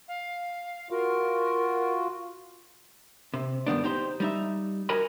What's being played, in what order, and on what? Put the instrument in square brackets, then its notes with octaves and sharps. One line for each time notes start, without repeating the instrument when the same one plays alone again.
[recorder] F5
[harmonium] F4 F#4 [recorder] A#4
[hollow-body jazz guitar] C3
G2 D#3 B3 D4
D#4 G4 C5
G3 D#4 E5
F#4 A#4 D#5 G#5 A#5 B5